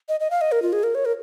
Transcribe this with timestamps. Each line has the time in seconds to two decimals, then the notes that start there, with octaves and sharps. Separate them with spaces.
0.09 D#5
0.20 D#5
0.31 F5
0.41 D#5
0.52 A#4
0.62 F4
0.73 G#4
0.84 A#4
0.95 C#5
1.05 A#4